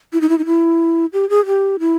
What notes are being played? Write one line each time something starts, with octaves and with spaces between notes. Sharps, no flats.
E4
D#4
E4
D#4
E4
G4
G#4
G4
E4